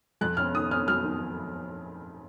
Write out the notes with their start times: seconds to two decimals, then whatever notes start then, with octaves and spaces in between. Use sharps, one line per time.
0.21 F2 F#6
0.37 C#4 F6
0.54 D#3 D#6
0.71 C#4 F6
0.88 F#3 F6
1.04 D#3